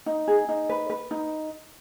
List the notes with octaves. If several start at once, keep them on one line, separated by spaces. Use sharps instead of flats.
D#4
G#4
D#4
B4
B4
D#4